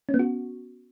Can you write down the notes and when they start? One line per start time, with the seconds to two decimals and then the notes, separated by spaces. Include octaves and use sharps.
0.09 C#4
0.14 B3
0.19 F#4